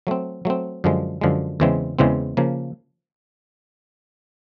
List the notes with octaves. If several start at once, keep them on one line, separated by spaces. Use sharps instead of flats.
F#3 A3 C4
F#3 A3 C4
F#2 D3 F3 G#3
F#2 D3 F3 G#3
E2 C#3 E3 G#3 C4
E2 C#3 E3 G#3 C4
C#3 F3 A#3